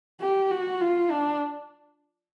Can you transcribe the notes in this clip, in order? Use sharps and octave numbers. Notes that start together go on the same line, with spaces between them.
G4
F#4
F4
D4